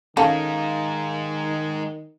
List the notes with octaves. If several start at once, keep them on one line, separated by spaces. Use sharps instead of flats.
D#3 G#3 C#4 D#4 A4 F5